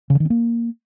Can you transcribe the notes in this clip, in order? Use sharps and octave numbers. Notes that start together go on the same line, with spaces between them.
C#3
D3
D#3
C4
A#3